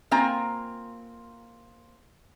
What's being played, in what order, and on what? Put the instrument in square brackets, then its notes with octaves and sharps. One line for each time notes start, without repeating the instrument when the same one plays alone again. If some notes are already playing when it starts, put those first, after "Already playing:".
[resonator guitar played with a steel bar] A#3 C4 F4 G#5 A#5